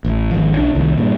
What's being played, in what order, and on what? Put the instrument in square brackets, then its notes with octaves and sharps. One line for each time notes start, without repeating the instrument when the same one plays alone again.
[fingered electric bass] A1
G#1 F3
B1 D4
C2 D#3
G2 A#2